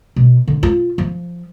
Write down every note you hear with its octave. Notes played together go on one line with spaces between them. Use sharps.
B2
D3
F4
F3